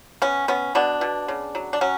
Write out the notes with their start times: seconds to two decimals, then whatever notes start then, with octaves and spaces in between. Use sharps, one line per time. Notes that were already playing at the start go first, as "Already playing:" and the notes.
0.22 B3 C#4
0.48 B3 C#4
0.75 B2 B3 D4
1.01 B2
1.28 C#3
1.55 F#3
1.73 D4
1.81 F#3 C#4